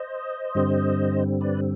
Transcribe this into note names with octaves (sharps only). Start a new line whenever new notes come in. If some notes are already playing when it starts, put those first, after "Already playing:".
Already playing: C5 D#5
G2 D3 G3 C4
B4 D5